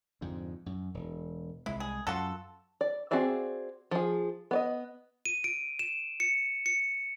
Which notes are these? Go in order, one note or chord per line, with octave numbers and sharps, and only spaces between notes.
F2 G#2 D3
F#2
E1
C2 G#3 E4
G#4
F#2 F4 F#4 A4
D5
C4 F#4 G#4 D5 E5
F3 G#4
B3 D5 D#5
D#7
D7
E7
C#7
C#7